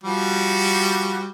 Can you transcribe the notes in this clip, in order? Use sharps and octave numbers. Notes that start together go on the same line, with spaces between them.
F3 G3 F#4